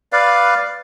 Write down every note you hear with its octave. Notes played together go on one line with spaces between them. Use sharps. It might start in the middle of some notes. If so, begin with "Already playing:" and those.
B4 D5 F5